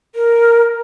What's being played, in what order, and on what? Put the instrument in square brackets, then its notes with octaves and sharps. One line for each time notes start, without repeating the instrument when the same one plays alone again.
[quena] A#4